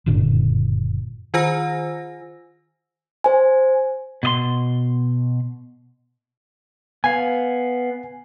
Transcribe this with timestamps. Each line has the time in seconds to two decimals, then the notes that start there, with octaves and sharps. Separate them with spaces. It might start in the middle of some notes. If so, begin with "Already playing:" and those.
0.06 F#1 G2 A#2 D3
1.34 D#3 F4 C5 G#5 E6 A#6
3.24 C5 G#5
4.23 B2 D#5 C6
7.04 B3 F5 G#5